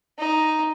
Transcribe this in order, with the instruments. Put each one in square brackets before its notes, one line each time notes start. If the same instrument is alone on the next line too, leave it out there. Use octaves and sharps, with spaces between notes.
[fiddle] D#4